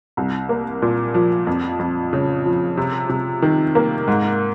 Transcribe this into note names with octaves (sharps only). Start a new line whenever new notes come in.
C2
A#3
A#2
F3
F2
F2
C#3
F3
C3
C3
D#3
A#3
G#2